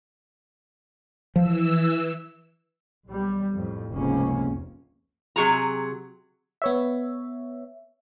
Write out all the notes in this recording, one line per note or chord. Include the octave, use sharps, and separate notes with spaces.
E3 F3 E6
B1 G3
F2 A2
F1 C#2 G#2 C3 A#3 C#4
C3 E3 F#3 G#4 A#5
B3 C#5 E5